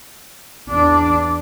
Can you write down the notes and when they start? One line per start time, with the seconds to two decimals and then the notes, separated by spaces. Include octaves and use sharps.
0.69 E2 D4